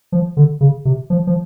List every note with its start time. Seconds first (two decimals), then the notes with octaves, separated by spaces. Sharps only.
0.12 F3
0.37 D3
0.61 C#3
0.85 C3
1.10 F3
1.27 F3